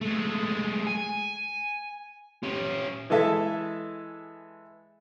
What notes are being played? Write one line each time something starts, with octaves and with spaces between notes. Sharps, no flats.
G#3 A3
G#5
C#4 G4
E3 G#3 A4 E5